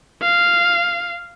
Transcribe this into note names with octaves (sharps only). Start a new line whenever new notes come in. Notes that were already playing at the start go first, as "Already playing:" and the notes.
F5